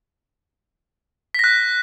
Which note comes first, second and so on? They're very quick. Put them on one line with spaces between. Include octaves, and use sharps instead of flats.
B6 A#6 F#6